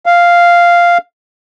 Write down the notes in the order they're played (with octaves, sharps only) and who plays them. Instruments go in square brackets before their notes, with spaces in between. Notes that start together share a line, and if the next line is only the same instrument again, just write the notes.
[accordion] F5